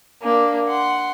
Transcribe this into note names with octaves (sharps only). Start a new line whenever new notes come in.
A#3 D4
F#5 C6